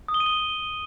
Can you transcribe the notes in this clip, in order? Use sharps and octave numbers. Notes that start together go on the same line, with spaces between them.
D#6
G7
D#7
G7